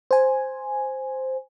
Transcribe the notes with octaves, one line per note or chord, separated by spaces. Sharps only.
C5 G#5